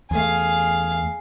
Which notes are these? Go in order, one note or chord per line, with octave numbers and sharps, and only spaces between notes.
E2 A3 G#4 F5